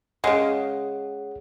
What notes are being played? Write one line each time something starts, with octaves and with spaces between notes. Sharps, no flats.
C#3 G#3 G#4 C#5 F#5